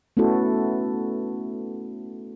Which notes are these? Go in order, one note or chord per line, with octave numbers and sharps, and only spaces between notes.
A3 B3 C#4 E4 F#4 A4